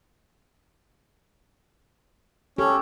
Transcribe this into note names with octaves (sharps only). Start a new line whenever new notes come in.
C#4 G4 A4